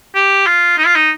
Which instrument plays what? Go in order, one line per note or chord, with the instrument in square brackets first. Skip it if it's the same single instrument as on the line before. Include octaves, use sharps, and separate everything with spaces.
[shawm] G4
F4
D#4
F4
D#4